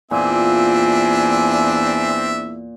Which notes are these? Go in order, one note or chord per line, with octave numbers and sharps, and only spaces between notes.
E2 A#2 C4 D4 E5 G#5